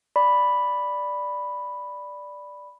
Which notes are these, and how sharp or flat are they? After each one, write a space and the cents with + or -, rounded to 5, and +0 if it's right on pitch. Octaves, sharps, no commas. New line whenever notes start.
D5 +0 B5 +0